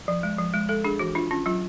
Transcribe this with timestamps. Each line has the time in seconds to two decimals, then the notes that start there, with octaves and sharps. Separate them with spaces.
0.08 F3
0.23 G#3
0.38 F3
0.54 G#3
0.69 G#3 A4
0.84 D4 G#4
0.99 E3 F#4
1.15 D4 F4
1.31 C#4 F4
1.46 F#3 F4